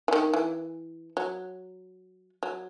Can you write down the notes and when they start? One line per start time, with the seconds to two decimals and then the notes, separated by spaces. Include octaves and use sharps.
0.08 E3
0.13 D#3
0.34 E3
1.17 F#3
2.43 F#3